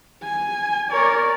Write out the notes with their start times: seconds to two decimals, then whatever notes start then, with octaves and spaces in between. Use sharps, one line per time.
0.23 G#5
0.91 A#4 C#5 D5